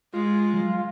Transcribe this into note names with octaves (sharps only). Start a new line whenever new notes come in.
G#3 F4
F#3